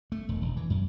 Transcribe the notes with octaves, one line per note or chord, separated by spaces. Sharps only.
A3
E1
E1
E3
F#2